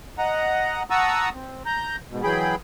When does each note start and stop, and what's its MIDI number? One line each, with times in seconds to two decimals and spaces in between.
0.18 0.83 75
0.18 0.83 78
0.18 0.83 82
0.90 1.29 78
0.90 1.29 81
0.90 1.29 82
0.90 1.29 85
0.90 1.29 87
0.90 1.29 88
1.33 1.63 60
1.66 1.96 82
1.66 1.96 91
2.10 2.23 44
2.10 2.23 47
2.23 2.55 52
2.23 2.55 54
2.23 2.55 68
2.23 2.55 79
2.23 2.55 83